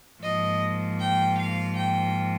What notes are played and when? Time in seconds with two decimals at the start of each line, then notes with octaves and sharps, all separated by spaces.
0.21 G#2 F3 A#3 D#5
0.99 G5
1.38 F5
1.77 G5